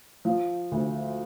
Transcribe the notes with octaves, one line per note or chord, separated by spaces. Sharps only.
F3
D2